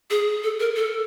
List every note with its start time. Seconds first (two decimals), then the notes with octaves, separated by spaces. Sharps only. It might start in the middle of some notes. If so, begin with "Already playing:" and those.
0.10 G#4
0.43 A4
0.60 A#4
0.76 A4